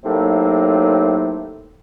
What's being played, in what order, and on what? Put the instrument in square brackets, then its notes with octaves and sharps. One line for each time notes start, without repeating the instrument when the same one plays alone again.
[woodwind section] F#2 A2 C3 F#3 A#3 D#4